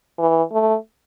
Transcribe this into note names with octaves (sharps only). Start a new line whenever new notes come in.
E3
A3